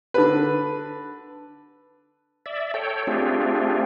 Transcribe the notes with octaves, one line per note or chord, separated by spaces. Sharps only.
D3 B4
D5 E5
A4 C#5 G5
A3 C4 D4 F4 G4 G#4